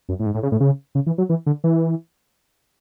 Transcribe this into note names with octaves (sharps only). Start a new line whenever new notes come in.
F#2
A2
G#2
A2
C#3
A2
C#3
C#3
E3
F#3
E3
D3
E3